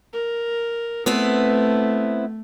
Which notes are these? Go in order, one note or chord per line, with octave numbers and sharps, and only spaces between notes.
A#4
A3 B3 C4 E4